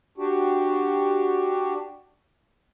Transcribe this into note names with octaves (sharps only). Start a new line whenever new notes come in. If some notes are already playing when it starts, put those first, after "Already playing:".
D4 F#4 G4